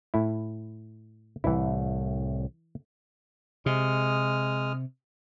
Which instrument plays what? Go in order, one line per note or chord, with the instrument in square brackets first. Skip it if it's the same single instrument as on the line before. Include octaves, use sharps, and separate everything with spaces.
[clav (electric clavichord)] A2 E4
[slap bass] C2 A2 [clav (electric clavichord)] E3 E4
[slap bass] C3 [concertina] G#3 D#6 F6